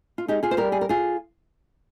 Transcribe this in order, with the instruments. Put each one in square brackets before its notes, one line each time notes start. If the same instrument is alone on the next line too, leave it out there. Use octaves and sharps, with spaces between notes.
[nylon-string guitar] F4
[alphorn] G#3 [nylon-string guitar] D#4 G4
[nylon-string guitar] F4 G#4
C5
[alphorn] G3 [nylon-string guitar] G4 A#4
[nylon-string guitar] G#4
A#4
F4 G#4